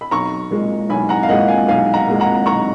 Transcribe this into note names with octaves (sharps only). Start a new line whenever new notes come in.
B5
B1 A#5 C#6
A#2 G#3
B1 G#5 B5
F#5 A#5
F5
A#2 G#3 D#5 F#5
F5 G#5
B1 F5 G#5
F#5 A#5
A#2 G#3
F#5 A#5
B1 A#5 C#6